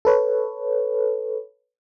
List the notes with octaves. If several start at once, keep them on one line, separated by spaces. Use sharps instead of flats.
A4 B4 C#5